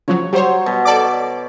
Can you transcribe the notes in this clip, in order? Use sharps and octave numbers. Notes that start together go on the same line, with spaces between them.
C#3 F3 F#3 C#5
F#3 G3 C5 C#5
B2
A4 D5 D6